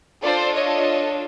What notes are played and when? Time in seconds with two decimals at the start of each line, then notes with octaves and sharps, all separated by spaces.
0.23 D4 F4 A4 C5 D5
0.54 C#5 D#5